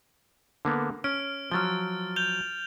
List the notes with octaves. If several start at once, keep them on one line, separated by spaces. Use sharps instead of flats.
D3 A#3 B3
C#4 F6 D7
F3 F#3 F6 A6 G7
G6 F7 G7